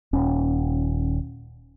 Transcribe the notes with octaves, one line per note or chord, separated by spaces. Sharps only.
D#1 C#4